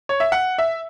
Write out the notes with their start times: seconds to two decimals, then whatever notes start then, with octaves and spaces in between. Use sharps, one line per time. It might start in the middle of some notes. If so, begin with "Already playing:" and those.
0.09 C#5
0.20 E5
0.32 F#5
0.58 E5